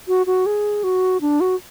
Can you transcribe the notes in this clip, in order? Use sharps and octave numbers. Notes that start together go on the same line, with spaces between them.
F#4
F#4
G#4
F#4
D4
F#4